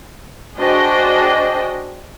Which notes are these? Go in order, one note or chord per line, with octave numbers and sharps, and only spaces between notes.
D4 F#4 G#4 C5 D#5 G5